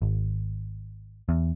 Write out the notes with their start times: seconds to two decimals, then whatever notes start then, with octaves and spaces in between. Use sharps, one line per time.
0.02 G#1
1.29 E2